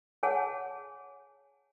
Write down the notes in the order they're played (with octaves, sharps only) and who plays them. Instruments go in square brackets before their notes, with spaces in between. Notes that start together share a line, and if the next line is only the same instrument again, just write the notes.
[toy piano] G#4 C#5 F#5 G#5 A5